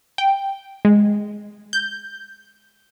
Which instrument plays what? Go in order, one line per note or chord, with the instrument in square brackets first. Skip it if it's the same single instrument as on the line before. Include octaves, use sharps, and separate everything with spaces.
[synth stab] G5
G#3
G6